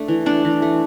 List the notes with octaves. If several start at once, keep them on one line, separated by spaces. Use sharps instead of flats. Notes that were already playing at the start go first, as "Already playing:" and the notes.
Already playing: A3 D4
E3
A3 D4
E3
A3